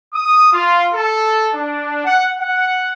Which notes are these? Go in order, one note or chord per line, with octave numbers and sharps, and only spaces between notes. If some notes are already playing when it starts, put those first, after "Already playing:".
D#6
F4
A4
D4
F#5
F#5